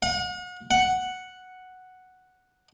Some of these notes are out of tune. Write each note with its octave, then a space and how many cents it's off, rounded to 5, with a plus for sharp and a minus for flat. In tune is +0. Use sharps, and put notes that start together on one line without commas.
F#5 -40
F#5 +0